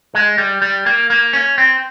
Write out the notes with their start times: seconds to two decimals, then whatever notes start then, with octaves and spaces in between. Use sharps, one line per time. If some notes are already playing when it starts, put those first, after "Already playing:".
0.15 G#3
0.38 G3
0.62 G3
0.86 A#3
1.10 A#3
1.33 C#4
1.58 C4